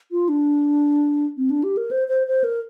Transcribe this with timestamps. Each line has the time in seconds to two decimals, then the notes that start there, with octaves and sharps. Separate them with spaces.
0.11 F4
0.29 D4
1.37 C4
1.50 D4
1.64 G4
1.77 A#4
1.91 C5
2.08 C5
2.27 C5
2.44 A#4